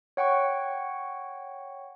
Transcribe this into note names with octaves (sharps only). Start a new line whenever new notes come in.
C#5 F#5 G5 C#6